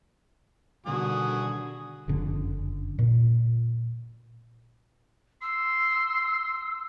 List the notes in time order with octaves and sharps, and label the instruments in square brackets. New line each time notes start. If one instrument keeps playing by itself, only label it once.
[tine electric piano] B2 D#3 G3 [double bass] D3 [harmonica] F#4 G#5 D#6
[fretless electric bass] F#1 F2 D3 C#4
A#2
[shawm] C6 [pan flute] E6